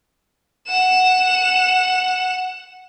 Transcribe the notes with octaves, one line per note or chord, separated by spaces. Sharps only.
F#5 E7